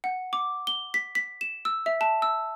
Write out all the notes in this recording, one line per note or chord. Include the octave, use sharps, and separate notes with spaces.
F#5
D6
G7
B6
B6
E7
E6
E5
A5
E6